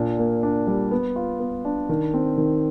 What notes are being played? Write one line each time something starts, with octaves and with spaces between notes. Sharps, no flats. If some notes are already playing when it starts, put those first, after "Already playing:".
Already playing: A#2 D4
A#3
D4
G3
B3
F4
B3
D4
D#3
C4
D#3